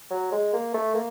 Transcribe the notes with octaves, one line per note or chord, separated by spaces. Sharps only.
F#3
G#3
A#3
A3
A#3